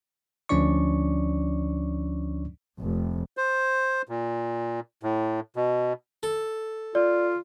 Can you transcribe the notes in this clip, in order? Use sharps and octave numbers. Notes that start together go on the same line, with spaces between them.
D2 F3 C#4 D4 D5 C#6
F1
C5
A#2
A2
B2
A4
F4 D5